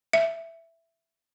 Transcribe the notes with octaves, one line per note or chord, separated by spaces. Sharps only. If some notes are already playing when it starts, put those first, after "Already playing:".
E5